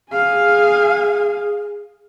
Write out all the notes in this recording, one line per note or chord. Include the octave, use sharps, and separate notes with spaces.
G#4 F5 G#5